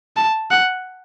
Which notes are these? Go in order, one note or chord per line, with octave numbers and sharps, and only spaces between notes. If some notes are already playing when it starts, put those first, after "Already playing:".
A5
F#5